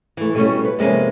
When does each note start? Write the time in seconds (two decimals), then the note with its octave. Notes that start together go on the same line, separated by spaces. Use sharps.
0.17 E3 A3
0.35 B2 G3 A3 C#4
0.65 B4
0.79 F2 C3 G#3 A#3 B3 C#4